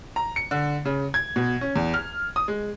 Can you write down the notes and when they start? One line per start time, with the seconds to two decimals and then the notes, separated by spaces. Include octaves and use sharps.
0.16 A#5
0.36 C#7
0.51 D3
0.85 C#3
1.14 G#6
1.36 B2
1.61 C#4
1.76 E2
1.94 F6
2.36 D#6
2.48 G#3